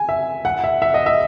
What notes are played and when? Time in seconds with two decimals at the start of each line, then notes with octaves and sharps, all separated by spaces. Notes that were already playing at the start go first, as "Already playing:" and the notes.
Already playing: G#5
0.09 E5
0.45 F#5
0.64 E5
0.82 E5
0.94 D#5
1.06 E5